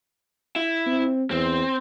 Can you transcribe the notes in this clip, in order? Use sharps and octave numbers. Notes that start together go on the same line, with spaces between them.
E4
C4
E2 C4